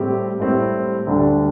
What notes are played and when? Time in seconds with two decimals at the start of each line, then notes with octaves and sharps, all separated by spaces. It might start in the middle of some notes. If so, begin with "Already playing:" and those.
Already playing: A2 G3 C4 G4
0.40 A2 G3 C4 E4
1.07 D2 D3 G3 D4